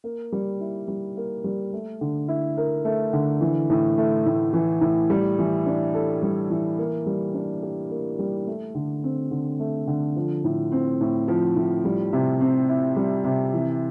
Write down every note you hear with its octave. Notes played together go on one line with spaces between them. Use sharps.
A#3
G3
E4
G3
A#3
G3
A3
D3
E4
A#4
A3
D3
E3
A2
A3
A2
E3
A2
G3
E3
D4
A4
G3
E3
A#3
G3
D4
G4
A#3
G3
A3
D3
C4
D3
A3
D3
F3
A2
C4
A2
F3
A2
G3
C3
C4
E4
G3
C3
E3